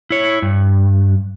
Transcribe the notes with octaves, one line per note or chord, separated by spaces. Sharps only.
E4 C#5
G2